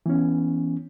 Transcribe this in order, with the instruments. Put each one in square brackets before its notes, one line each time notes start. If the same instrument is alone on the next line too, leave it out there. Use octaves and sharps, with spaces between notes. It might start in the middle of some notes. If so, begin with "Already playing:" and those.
[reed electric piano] E3 B3 C#4